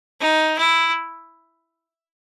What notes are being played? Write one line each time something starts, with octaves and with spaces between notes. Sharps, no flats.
D#4
E4